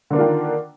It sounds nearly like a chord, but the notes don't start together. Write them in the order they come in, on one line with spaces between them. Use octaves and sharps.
D3 A#3 D4 F4 D#3